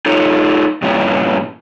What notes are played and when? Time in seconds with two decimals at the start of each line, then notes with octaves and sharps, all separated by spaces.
0.06 D#4 F4 A4 C#5
0.82 G2 A#2 E3 C#4